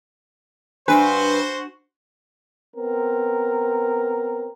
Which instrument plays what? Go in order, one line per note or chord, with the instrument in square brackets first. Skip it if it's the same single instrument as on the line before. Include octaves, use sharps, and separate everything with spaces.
[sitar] G2 B4 [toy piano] D4 [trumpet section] F#4 C5
[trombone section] B3 C4 A#4